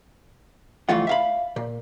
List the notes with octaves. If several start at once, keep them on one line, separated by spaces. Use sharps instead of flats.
C2 F2 E3 A3 F4 F#5
E5 F5 B5
A#2